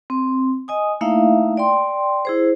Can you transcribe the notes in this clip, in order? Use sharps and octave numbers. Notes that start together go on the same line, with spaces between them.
C4
D#5 G#5 D#6
A3 A#3 D#4 E4 E5 F5
D5 G5 C6
E4 G#4 C5